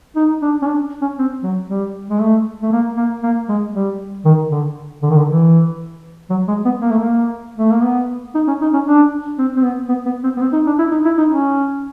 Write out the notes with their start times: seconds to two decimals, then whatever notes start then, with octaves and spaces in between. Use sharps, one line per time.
0.16 D#4
0.42 D4
0.62 C#4
0.66 D4
1.01 C#4
1.18 C4
1.44 F#3
1.69 G3
2.10 G#3
2.20 A3
2.63 A3
2.72 A#3
2.97 A#3
3.23 A#3
3.49 G#3
3.74 G3
4.25 D#3
4.51 D3
5.03 D3
5.10 D#3
5.17 D3
5.28 E3
6.30 F#3
6.48 G#3
6.65 B3
6.82 A#3
6.91 A3
6.99 A#3
7.58 A3
7.72 A#3
7.84 B3
8.35 D#4
8.48 C#4
8.62 D#4
8.74 C#4
8.86 D4
9.39 C4
9.57 C4
9.63 B3
9.89 B3
10.06 B3
10.23 C4
10.37 B3
10.41 C4
10.53 D#4
10.67 D4
10.79 E4
10.92 D#4
11.05 E4
11.18 D#4
11.30 C#4